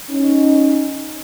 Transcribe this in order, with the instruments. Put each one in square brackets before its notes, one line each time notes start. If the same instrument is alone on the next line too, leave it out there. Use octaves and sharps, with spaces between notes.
[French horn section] C#4 D#4